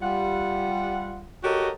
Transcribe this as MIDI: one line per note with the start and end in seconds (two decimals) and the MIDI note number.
0.02 1.24 55
0.02 1.24 65
0.02 1.24 78
1.44 1.70 66
1.44 1.70 67
1.44 1.70 69
1.44 1.70 70
1.44 1.70 73
1.44 1.70 75